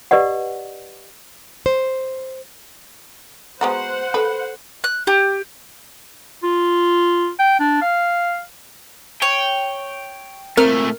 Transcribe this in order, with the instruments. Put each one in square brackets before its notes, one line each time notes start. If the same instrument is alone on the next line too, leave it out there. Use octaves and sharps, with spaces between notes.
[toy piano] G4 B4 D5 D#5 F#5
[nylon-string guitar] C5
[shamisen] G#3 B3 F#4 [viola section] C5 F#5 [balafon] A#5 C#6
[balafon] A4 [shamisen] B4
[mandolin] F#6
G4
[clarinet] F4
G5
D4
F5
[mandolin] C#5 [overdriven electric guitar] G5
[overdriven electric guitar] A#2 A3 [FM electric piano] C4 [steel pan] A#4 [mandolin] F6